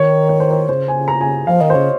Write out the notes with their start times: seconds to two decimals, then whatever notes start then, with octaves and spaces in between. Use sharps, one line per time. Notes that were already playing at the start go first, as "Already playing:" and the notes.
Already playing: D#3 C#5
0.29 C#5
0.40 C5
0.51 C#5
0.69 C#3 C5
0.88 G#5
1.08 A#5
1.21 G#5
1.47 F3 F5
1.60 D#3 D#5
1.70 C5
1.73 C#3 C#5